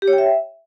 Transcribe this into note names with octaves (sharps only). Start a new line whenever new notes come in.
G4
C#5
G5
E5